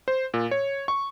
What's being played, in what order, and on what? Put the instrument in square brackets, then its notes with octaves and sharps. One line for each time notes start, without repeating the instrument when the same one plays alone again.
[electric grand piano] C5
A#2
C#5
C#6